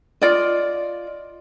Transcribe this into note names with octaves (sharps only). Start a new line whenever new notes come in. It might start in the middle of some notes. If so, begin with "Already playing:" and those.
F4 D5 D#5